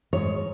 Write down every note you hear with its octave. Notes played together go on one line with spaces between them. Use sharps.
G#2 G#3 C#5